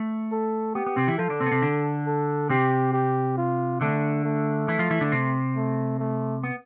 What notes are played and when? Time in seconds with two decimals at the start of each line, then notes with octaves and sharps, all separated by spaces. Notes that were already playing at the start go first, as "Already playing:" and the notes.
Already playing: A3
0.32 A4
0.75 B3 G4
0.86 B3
0.96 C3 C4
1.07 E3 E4
1.18 F3 F4 A4
1.30 D3 D4
1.40 C3 C4
1.46 B3
1.51 C3 C4
1.62 D3 D4
2.07 A4
2.49 C3 C4 G4
2.93 G4
3.37 F4
3.81 D3 A3 D4
4.24 A3
4.68 E3 E4
4.79 F3 F4
4.91 E3 E4
5.01 D3 D4
5.12 C3 C4
5.56 A3
5.99 A3
6.44 B3